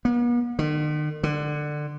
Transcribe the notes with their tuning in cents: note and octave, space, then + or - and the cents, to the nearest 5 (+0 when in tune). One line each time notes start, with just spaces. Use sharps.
B3 -45
D#3 -45
D3 +20